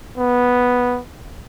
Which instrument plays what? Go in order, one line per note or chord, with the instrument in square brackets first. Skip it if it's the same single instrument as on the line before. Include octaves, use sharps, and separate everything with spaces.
[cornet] B3